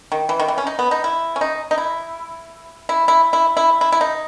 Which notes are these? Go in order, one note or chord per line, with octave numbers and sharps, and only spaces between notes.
D#3
E3
D#3
E3
C#4
D#4
B3
D#4
E4
C#4
D#4
D#4
E4
E4
E4
E4
E4
E4
E4
D#4